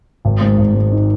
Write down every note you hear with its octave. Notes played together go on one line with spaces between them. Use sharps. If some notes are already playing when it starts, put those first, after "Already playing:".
G#1
G#2
G#1
G#2
D#3